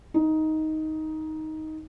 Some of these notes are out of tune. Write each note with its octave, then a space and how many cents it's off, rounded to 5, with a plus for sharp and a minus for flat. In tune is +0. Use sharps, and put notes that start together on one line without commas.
D#4 +10